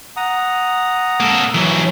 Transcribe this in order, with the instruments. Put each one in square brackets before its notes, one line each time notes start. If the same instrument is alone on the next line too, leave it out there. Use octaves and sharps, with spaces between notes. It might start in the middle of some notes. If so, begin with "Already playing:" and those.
[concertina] F#5 A#5 D#6
[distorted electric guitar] A#3 A4
E3 F#3